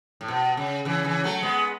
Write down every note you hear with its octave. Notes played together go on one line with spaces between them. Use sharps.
A2
B2
C#3
C#3 E3
C#3 E3
F#3 A3
G#3 B3